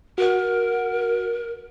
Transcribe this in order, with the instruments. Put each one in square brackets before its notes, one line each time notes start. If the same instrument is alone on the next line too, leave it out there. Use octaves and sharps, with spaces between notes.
[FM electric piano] F#4 F#5 [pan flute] A#4